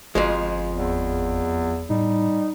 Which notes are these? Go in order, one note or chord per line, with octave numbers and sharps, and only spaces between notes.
G1 F2 F3 G#3
E2
A2 G3 D#4